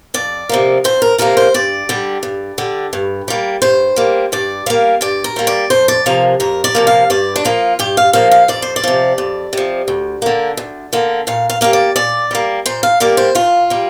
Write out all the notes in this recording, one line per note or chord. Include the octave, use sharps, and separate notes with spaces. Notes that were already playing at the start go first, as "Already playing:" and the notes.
F2 D5
C3 F3 A#3
F2 C5
A#4
C3 F3 A#3 A#4
C5
G2 D5
D3 G3
G2
D3 G3
G2
G3 A#3
G2 C5
G3 A#3
G2 D5
G3 A#3 F5
G2 D5
A#4
G3 A#3
D5
F2 C5
D5
C3 F3 A#3 F5
F2 A#4
D5
C3 F3 A#3
F5
G2 D5
D4
F3 A#3 F4
G2 G4
F5
F3 A#3 F5
F5
F2 D5
C5
D5
C3 F3
F2
C3 F3
D2
D3 A#3
D2
D3 A#3
A#2 F5
F5
G3 A#3 F5
D5
A#2 D5
G3 A#3
A#2 C5
F5
G3 A#3 D5
C5
A#2 F4
G3 A#3